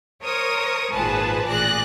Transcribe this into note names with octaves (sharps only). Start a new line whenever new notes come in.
A#4 C5 C#5 C#6 D#6
G#1 A#2 F3 G#4 B4 A5
A1 A#2 G#4 D5 F#6 A#6